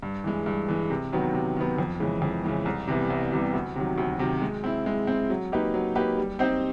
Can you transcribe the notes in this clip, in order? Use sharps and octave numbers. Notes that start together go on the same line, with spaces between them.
G2
E3 G#3
G2
E3 G#3
C3
D#3 F#3 B3
C3
D#3 F#3 B3
F2
C#3 E3 G#3
F2
C#3 E3 G#3
C2
C3 E3 G3 B3
C2
C3 E3 G3 B3
D2
C3 D#3 F#3
D2
C3 D#3 F#3
G#3
C4 E4
G#3
C4 E4
F#3
A#3 D#4 G4 B4
F#3
A#3 D#4 G4 B4
G3
C4 D#4 G4 C5